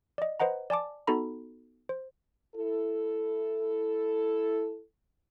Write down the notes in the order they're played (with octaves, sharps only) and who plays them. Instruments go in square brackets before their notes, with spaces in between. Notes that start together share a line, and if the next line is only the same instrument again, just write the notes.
[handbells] D5 D#5
B4 C5 D#5 F#5 A#5
D5 G#5 A5 D6
B3 D#4 F#4 A4 A#5 B5
C5
[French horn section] E4 A4